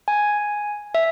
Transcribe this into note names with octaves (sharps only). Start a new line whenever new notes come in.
G#5
E5